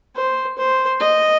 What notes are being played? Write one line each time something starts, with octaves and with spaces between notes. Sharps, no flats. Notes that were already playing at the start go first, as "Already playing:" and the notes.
C5
C5
D#5